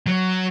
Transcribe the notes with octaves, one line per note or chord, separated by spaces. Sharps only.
F#3